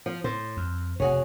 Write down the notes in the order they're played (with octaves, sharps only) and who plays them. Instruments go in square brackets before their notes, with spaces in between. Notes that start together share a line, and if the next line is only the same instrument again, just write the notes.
[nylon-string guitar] F3
[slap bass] A2 [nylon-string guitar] C5
[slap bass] F2
[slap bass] F1 [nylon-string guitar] F#4 G#4 C#5